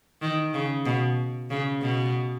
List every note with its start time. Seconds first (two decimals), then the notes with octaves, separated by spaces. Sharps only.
0.22 D#3
0.54 C#3
0.86 B2
1.50 C#3
1.82 B2